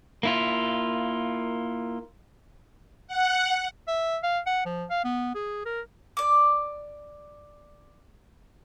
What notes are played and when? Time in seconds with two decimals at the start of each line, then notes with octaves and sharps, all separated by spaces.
0.23 A#3 E4 F4
3.08 F#5
3.88 E5
4.23 F5
4.47 F#5
4.66 F3
4.90 F5
5.04 B3
5.35 G#4
5.66 A#4
6.17 D5 D6